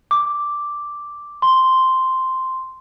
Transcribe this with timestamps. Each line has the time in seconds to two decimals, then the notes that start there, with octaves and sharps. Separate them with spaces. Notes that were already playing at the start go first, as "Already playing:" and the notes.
0.11 D6
1.42 C6